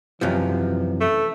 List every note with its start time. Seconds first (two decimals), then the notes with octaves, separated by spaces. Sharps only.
0.21 F#2 C3 E3 F3
1.00 A3